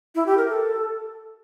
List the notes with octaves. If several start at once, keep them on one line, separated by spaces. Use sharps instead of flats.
E4
G4
A#4
A4